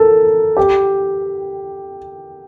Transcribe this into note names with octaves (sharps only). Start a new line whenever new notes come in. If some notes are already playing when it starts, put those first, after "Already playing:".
Already playing: A4 A#4
G4